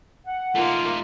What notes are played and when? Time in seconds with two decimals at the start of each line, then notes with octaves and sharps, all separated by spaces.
0.25 F#5
0.55 A3 A#3 D#4 F4